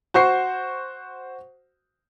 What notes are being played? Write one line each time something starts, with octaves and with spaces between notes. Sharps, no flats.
F#4 C5 C#6 C7